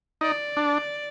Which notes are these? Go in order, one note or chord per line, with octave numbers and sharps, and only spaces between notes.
D#4 D5
D4